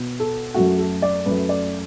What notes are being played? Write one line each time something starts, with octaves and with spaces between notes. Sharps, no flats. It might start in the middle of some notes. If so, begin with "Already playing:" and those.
Already playing: B2 B3
A4
F#2 F#3 A3 F#4
A4
D5
F#2 F#3 A3 B4
D5